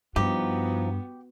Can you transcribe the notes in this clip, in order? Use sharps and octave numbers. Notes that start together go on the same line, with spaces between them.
G2 F3 B3 D#4 F#4 G4